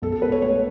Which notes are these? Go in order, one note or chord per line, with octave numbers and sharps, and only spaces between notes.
B1 A4
A4
B2 B4
C#5
A3 C#5